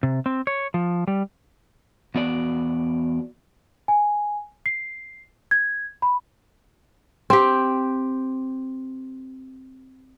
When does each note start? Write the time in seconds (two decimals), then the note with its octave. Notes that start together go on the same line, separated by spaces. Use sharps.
0.03 C3
0.26 C4
0.47 C#5
0.74 F3
1.07 G3
2.15 E2 B3 F#4 D5
3.88 G#5
4.66 C7
5.51 G#6
6.02 B5
7.30 C4 G4